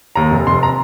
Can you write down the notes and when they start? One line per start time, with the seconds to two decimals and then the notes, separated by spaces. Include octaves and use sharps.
0.15 D#2 A#5
0.31 F1
0.47 F1 C6
0.63 A#5